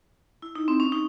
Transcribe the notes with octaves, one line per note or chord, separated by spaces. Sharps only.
E4
D#4
C4
C#4
D#4